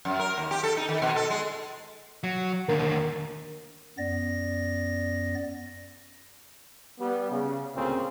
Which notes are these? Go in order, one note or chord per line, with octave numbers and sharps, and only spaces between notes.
F#2
A#4
D#2
G4
A4
D#4
D#3
B2
A4
G#3
F#3
D#2 D3 A#4
F#2 B3 D5 A#6
G3 B3
C#3
D2 A#2 C#3 C4